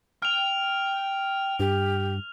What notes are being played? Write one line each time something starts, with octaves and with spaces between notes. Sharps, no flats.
G5 F6 F7
G2 G4